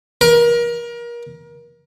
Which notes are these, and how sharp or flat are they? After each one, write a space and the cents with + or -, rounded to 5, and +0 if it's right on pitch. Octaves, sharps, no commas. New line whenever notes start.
A#4 +30